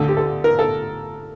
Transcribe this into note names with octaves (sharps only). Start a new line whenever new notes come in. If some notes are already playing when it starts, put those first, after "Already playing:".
Already playing: D2 D3 A4
G4
A4
A#4
A4